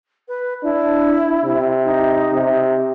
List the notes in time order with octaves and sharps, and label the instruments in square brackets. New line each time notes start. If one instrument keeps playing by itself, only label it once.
[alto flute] B4
[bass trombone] D4 [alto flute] E4
[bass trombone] C3
[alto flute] D#4
[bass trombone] C3